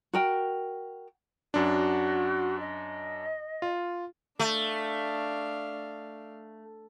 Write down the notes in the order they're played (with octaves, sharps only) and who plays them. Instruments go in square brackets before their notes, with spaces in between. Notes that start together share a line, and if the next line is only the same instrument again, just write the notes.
[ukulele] F#4 A#4 G5
[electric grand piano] F#2 D4 [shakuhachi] F#4
[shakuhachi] D#5
[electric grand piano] F4
[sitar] A3 [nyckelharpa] D4 F5